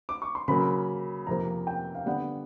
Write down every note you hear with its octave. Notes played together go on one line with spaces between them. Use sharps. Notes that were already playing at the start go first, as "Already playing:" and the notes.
D6
C#6
C6
C#3 F#3 A#3 B5
F2 C3 F3 A#3 A#5
G5
F5
D3 G3 B3 D4 F#5